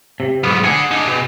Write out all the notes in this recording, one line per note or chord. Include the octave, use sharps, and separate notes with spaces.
C3
B1 G#2 B3
D4 G#4 F#5 G#5
D4 D#4
B2